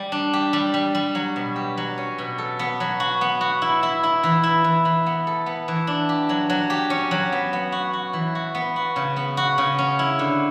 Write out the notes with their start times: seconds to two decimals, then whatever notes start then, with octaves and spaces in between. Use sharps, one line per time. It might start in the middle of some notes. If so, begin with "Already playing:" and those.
Already playing: G3
0.12 D4
0.33 G4
0.53 G3
0.74 G3
0.95 G3
1.15 F#3
1.36 B2
1.56 G4
1.78 F#3
1.98 C#4
2.18 B2
2.38 A4
2.59 B3
2.80 F#3
3.00 F#4
3.21 B3
3.41 F#4
3.62 E4
3.83 E4
4.03 E4
4.23 E3
4.43 E4
4.64 E3
4.85 E3
5.06 B3
5.27 A4
5.46 B3
5.68 E3
5.87 D4
6.09 G4
6.29 F#3
6.50 F#3
6.70 G4
6.90 C#4
7.11 F#3
7.32 B3
7.53 B3
7.72 F#4
7.93 F#4
8.13 E3
8.35 F#4
8.55 B3
8.76 F#4
8.96 C#3
9.16 B3
9.37 F#4
9.58 C#3
9.78 C#4
9.99 E4
10.19 D3